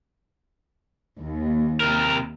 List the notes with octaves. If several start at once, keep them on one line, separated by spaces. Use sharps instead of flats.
D#2
C3 A#4